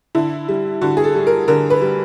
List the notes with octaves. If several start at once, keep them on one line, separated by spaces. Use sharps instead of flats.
D3 E4
G3
D3 F#4
G#4
A4
G3
A#4
D3 A#4
B4
G3